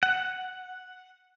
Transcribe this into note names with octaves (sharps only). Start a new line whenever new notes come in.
F#5